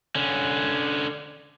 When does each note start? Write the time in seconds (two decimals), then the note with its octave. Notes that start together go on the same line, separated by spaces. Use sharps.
0.15 D3 C#4